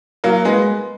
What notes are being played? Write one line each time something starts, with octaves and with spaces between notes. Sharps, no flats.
F#3 A#3
G#3 B3